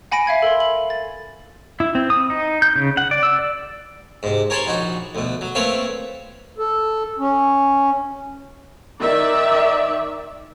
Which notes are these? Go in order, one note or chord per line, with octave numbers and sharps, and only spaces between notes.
F#5 G#5 B5 A#6 D7
E5 F5 G#6
A4 A#4 E5 C6
F#7
A6
E4
C4
D#6
D#4
G6
C#3
F#5
D5
E6
D5
G#2 C3
A#4 C#5 G#5 A5 B5 C6
A#1 D#4 F#4
D2 B2
F#3
A3 A#3 C4 B4 C#5 F5
A4
C#4
D#3 D5 E5